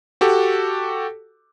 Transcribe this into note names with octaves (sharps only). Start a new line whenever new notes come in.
F#4 G4 A4